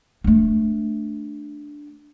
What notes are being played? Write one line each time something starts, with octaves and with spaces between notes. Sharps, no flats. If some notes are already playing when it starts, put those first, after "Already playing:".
A3 D4